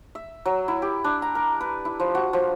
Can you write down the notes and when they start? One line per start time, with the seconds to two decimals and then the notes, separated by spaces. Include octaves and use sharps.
0.15 E5
0.45 F#3
0.68 E4
0.82 G4
1.04 D4
1.22 A#5
1.35 A#4
1.61 B4
1.85 E4
2.00 F3
2.15 F#4
2.33 F3